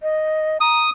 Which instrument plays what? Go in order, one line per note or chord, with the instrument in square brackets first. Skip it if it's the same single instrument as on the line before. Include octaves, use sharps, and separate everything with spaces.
[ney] D#5
[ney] A#5 [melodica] D#6